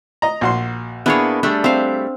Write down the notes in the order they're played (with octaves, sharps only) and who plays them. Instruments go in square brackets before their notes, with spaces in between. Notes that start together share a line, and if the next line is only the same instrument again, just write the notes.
[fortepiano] D#5 A#5
A#1 F#4 C6
[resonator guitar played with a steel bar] A#3 B3 E4 [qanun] D4 G#4 C#5
[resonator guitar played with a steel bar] G3 A3 [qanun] D4
[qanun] C4 F5 [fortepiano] E5